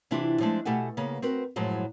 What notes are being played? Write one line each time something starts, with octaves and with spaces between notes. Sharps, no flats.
C3 E3 D4 E4 F4 G4
F3 G#3 A3 D4
B2 A3 G4 A4 F#5 G#5
C#3 A#3 B3
C4 F#4 A#4 B4
F#2 A2 F3 F#3 G#3